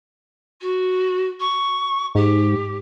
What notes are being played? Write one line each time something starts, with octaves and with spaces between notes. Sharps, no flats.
F#4
C#6
G#2 G4